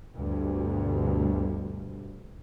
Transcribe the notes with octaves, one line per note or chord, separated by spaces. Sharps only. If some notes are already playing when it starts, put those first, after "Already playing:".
D2 G2 B2